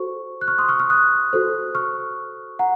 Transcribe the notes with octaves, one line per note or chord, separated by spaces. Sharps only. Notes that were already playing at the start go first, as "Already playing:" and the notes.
Already playing: F#4 A4 C5 C#6
F#6
C#6 F6
C6 D#6
C#6 F6
C#6 F6
D#6 F#6
F#4 A4 C5
C#6 F6
F#5 A#5